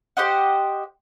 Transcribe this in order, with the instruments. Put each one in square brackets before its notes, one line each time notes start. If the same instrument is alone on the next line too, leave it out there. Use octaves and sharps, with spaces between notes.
[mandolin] G4 C5 D#5 F#5